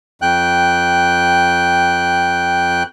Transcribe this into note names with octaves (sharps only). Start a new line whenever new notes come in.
F2 G5 F#6